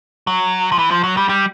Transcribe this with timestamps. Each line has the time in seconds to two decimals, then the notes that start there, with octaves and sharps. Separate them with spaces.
0.27 F#3
0.72 F3
0.79 E3
0.91 F3
1.04 F#3
1.17 G3
1.29 G3